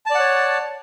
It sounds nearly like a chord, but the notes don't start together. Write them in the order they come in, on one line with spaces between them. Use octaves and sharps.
A5 D5 F#5 C#5